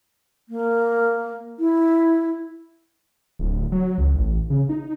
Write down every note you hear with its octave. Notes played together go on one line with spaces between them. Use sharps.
A#3
E4
D1
F#3
C#2
A1
C#3
D#4